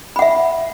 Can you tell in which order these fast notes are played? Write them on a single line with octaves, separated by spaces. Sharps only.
B5 F#5 E5